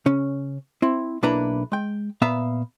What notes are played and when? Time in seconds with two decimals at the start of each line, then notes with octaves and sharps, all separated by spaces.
0.06 C#3 C#4
0.82 C4 E4
1.23 B1 A#3 D4 E4 B4 A#5
1.72 G#3 G5
2.22 A#2 B3 E5 F5 A#5